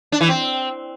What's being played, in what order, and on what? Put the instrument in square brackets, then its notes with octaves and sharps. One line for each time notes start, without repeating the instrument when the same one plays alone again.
[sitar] D4
E3
C4